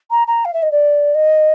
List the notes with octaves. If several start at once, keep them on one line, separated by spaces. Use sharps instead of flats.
A#5
A#5
F5
E5
D#5
D5
D#5